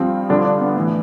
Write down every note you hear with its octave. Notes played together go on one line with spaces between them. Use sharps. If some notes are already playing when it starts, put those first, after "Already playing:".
Already playing: G2 F3 C4
G2 D3 F3 D4
D4
B3
A2 E3